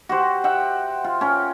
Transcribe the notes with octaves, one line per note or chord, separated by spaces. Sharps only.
F#4 G4 C5
E5 F#5 G5
F4
C#4 A#4 G5